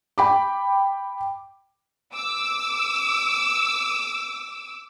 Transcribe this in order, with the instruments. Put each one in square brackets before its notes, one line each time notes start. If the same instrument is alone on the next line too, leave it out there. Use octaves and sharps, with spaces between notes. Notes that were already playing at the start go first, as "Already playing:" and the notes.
[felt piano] G5 B5 D6
[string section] D6 E6